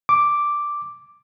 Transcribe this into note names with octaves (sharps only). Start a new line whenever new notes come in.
D6